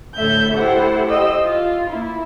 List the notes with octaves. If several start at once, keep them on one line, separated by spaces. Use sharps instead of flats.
D2 A2 A4 E5 G6
E4 G4 A4 C5 F#5
G4 C5 D#5 E6
F4
A#3 E4